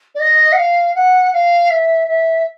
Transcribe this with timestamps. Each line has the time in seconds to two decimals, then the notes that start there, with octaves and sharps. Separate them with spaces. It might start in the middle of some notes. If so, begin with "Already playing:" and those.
0.14 D5
0.19 D#5
0.52 F#5
0.57 F5
0.95 F#5
1.33 F5
1.70 E5
2.08 E5